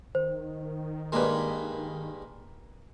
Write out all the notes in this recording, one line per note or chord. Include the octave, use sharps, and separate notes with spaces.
D#3 C5
G2 G#3 A#3 B4